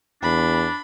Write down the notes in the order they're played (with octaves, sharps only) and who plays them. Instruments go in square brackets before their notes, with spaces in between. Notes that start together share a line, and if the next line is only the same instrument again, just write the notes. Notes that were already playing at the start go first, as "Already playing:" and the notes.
[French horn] E2 [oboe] D4 [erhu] B5